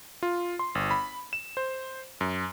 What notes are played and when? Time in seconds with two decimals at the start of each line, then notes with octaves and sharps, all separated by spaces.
0.23 F4
0.59 C6
0.75 G1
0.91 B5
1.33 E7
1.57 C5
2.21 F#2